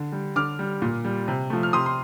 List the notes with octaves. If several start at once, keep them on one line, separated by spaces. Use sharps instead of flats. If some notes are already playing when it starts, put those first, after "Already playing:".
Already playing: D3
G3
D3 D6 F6
G3
A#2
G3
C3
F3 A3
F6
C3 C6 D#6
C6